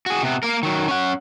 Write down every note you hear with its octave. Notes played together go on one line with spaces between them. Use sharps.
F#4 G#4
C3 B3
A#3 A#4
D#3 F#3
C#4 F#5